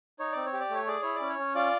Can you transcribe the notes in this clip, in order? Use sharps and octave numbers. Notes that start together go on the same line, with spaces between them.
D#4 C#5
C4 D5
C#5
G4
D5
A3 C#5
G#4 D5
E4 C#5
D5
C#4
C#5
C#4
F4 D5